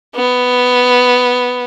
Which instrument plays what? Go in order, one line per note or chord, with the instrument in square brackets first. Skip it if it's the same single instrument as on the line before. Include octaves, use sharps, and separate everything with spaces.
[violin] B3